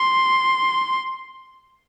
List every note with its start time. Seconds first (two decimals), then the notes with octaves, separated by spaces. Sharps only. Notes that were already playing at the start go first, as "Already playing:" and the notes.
Already playing: C6